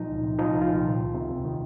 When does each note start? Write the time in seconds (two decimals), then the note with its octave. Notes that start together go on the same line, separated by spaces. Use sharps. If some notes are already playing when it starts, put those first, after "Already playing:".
Already playing: A#2 F3 D#4
0.09 C#2
0.23 C3
0.38 F3 D#4
0.54 C2
0.62 F4
0.69 A#2
0.84 D#3
0.99 C#2
1.14 C3
1.30 D#2
1.44 D#3